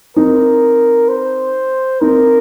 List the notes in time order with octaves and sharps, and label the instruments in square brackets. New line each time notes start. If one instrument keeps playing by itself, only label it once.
[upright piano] C4 D#4 [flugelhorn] A#4
[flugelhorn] C5
[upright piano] C4 D#4 [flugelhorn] A#4